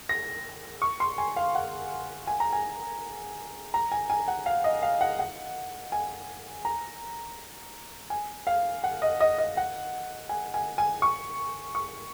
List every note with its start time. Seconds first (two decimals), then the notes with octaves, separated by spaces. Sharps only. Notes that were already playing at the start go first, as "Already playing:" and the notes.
0.09 A#6
0.82 C#6
1.00 C6
1.18 G#5
1.36 F5
1.55 F#5
2.27 G#5
2.40 A#5
2.53 G#5
3.74 A#5
3.92 G#5
4.10 G#5
4.28 F#5
4.46 F5
4.64 D#5
4.82 F5
5.01 F#5
5.19 F#5
5.92 G#5
6.65 A#5
8.10 G#5
8.47 F5
8.84 F#5
9.02 D#5
9.20 D#5
9.38 D#5
9.57 F#5
10.29 G#5
10.54 G#5
10.78 G#5
11.02 C#6
11.75 C#6